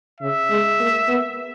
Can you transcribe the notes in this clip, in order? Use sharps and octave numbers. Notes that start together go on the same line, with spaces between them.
C#3 E5
G#3
A#3
B3